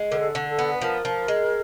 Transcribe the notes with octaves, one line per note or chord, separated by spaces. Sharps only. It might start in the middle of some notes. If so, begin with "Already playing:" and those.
Already playing: G#3
D3 A#4
A4
D3
A4
B3
B4
F3 A#4
F3
G#3